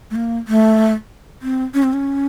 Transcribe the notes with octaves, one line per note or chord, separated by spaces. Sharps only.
A3
A#3
A3
C4
C#4
C4
C#4